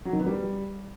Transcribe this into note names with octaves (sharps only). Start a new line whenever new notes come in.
F#3
D#3
B3
G3